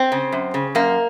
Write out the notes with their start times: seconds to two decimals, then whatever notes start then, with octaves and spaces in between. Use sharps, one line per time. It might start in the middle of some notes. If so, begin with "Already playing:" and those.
Already playing: C4
0.12 C#3
0.32 F#2
0.54 C#3
0.75 F#2 A#3